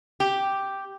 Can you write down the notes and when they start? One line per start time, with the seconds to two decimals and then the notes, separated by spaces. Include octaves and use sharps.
0.20 G4